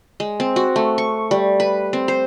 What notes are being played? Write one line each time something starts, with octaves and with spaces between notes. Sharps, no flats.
G#3
C4
F#4
A3
C#6
G3
B4
C4
C5